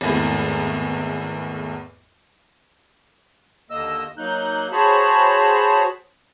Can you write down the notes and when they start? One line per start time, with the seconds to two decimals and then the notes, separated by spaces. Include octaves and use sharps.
0.01 G#1 E2 A2
3.70 D#2 D3 A#3 D#5 E6
4.18 F#3 A#3 D#4 F#6 G6
4.72 F#4 G#4 C5 C#5 A5 B5